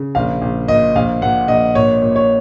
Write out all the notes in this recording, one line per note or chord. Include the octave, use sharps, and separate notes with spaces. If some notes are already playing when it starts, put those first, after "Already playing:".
Already playing: C#3
A#1 F5
A#1
A#2 D#5
A#1 F5
A#2 F#5
A#1 D#5
A#2 C#5
A#2
C#5